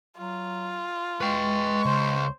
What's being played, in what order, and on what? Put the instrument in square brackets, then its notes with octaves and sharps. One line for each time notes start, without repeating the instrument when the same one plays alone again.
[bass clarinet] F#3 [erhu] F4
[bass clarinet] G#3 [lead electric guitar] B4 G5 [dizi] C#6
[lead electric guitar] C#2 [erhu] C5